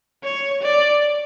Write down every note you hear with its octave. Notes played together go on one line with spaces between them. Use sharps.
C#5
D5